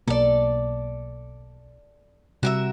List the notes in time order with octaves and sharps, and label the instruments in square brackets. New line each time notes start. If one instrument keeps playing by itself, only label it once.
[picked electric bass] B1 B2 A#3 [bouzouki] A4 D5
[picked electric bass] C3 G3 [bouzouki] F#4 A#4 E5